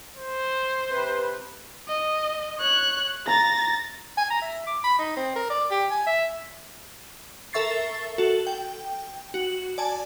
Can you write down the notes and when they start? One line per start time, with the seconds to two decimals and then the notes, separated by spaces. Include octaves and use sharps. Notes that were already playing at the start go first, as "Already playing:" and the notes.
0.16 C5
0.89 C3 B4
1.88 D#5
2.59 C#5 F#6
3.27 A#5 A6 A#6
4.17 G#5
4.30 A#5
4.42 E5
4.67 D6
4.84 B5
4.99 D#4
5.17 C4
5.36 A#4
5.50 D5
5.71 G4
5.91 G#5
6.06 E5
7.53 A4 A#4 E5 C#6 A6 C7
8.18 F#4 A4
8.47 G5
9.34 F#4
9.78 D5 G#5 A5